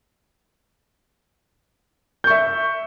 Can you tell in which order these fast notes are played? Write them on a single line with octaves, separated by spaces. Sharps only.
G6 C#6 E5